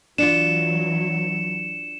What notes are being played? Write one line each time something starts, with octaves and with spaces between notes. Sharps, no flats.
E3 F#3 D4 F4 C#7 E7